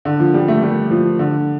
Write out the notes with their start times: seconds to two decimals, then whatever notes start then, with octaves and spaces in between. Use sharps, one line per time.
0.05 D3
0.20 F3
0.34 G3
0.48 A3
0.62 G3
0.90 F3
1.19 D3